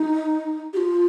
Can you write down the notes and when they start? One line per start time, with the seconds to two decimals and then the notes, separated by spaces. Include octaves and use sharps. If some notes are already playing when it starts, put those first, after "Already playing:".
Already playing: D#4
0.73 G4
0.77 F4